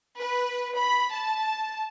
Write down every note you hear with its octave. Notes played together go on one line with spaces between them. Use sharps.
B4
B5
A5